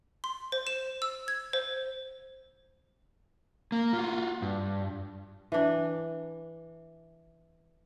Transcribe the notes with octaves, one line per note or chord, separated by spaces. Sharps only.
C6
C5
E7
E6
G#6
C5
A#3
F4 F#4
G2
E3 D4